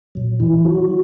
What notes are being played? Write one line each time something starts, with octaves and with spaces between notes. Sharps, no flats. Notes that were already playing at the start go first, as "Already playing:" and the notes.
A#2 F#3
E3 E4
F#3 F#4